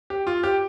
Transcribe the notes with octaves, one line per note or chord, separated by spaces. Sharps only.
G4
F4
G4